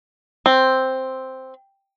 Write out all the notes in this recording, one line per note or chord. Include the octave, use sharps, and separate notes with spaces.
C4